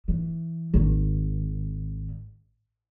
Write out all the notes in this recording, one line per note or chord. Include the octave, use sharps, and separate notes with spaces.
E3
G#1